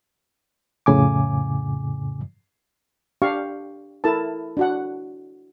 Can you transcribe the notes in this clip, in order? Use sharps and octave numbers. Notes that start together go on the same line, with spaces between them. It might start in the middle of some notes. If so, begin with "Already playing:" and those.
F2 A2 C#3 G#5 D6
D4 G4 F5 C#6
E4 A4 A#4 A5
D4 F#4 F#5